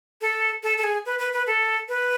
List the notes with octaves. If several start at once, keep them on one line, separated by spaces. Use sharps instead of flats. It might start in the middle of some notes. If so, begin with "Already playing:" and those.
A4
A4
A4
G#4
B4
B4
B4
A4
B4